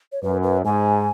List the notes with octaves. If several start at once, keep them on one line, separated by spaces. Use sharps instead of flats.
C#5
F#2 B4
B4
G#2 G#5